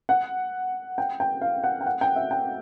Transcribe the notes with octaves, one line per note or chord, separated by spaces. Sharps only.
F#5
G5
G5
F5
F#5
G5
F#5
G5
E5
G5